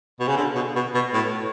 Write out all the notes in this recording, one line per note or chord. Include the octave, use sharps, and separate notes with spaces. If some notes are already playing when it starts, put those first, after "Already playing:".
B2
C#3
D3
B2
B2
B2
A2